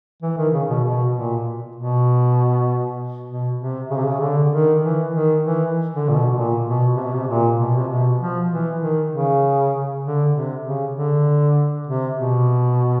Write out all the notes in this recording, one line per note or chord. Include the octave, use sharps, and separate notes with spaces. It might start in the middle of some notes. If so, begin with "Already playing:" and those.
E3
D#3
C#3
B2
B2
A#2
B2
B2
C3
C#3
C3
C#3
D3
D#3
E3
D#3
E3
D3
A#2
B2
A#2
B2
C3
B2
C3
A#2
B2
C3
B2
F3
E3
D#3
C#3
D3
C3
C#3
D3
C3
B2